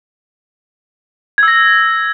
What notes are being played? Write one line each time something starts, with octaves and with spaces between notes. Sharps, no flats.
E6 G#6 A#6